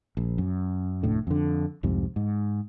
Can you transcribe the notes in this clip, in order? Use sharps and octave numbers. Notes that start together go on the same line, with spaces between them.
A#1
F#2
F1 D2 A2 D3
F2 D3
C2 F2 G#2 C3
G#2